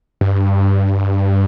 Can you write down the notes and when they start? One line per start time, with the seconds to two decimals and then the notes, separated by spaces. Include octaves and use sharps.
0.21 G2